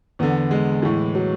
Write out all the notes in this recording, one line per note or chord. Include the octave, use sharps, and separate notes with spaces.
E2 D3 B3
G#3
A2 E3
F#3